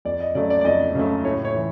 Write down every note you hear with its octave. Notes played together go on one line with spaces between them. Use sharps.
F2 D5
D#5
C#3 F#3 A3 D5
D5
D5
F2 D#5
C#3 F#3 A3
A2 C#5
C#5
E3